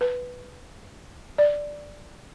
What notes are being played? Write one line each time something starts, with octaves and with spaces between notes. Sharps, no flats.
B4
D5